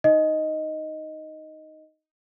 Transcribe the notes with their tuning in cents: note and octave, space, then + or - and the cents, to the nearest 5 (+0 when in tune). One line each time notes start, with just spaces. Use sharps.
D#4 +0 D#5 +0